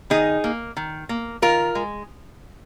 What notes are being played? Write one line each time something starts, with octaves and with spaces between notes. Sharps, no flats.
D#3 D#4 G#4
A#3
D#3
A#3
D#3 F4 A#4
G#3